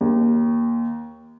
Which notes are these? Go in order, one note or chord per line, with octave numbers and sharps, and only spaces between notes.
D#2